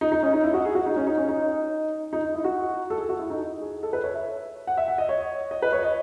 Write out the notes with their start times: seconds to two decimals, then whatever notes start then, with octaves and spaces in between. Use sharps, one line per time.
0.01 D#4
0.12 D#4
0.23 C#4
0.33 D#4
0.44 E4
0.54 F#4
0.65 G#4
0.75 F#4
0.86 D#4
0.96 C#4
1.07 D#4
1.17 C#4
1.28 D#4
2.13 D#4
2.35 E4
2.44 F#4
2.90 A4
2.98 G#4
3.09 F#4
3.19 E4
3.30 D#4
3.61 G#4
3.83 A4
3.93 B4
4.04 C#5
4.14 E5
4.67 F#5
4.77 E5
4.88 F#5
4.98 D#5
5.09 C#5
5.51 D#5
5.62 B4
5.72 C#5
5.83 D#5